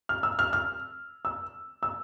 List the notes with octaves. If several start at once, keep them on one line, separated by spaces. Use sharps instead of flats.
F6
E6
F6
F6
E6
E6